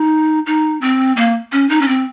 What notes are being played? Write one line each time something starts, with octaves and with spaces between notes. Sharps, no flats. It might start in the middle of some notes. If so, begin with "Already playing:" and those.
Already playing: D#4
D#4
C4
A#3
C#4
D#4
C#4
C4